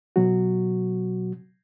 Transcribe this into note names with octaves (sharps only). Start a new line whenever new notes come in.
B2 F#3 F#4